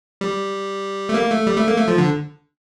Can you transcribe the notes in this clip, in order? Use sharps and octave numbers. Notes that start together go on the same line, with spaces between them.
G3
A3
A#3
A3
G3
A3
A#3
A3
F3
D3